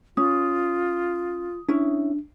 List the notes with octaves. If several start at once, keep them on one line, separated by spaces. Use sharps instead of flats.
C#4 F4 D#6
C#4 D4 E4